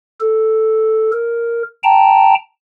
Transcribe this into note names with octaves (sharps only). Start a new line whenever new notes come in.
A4
A#4
G5 A5 A#5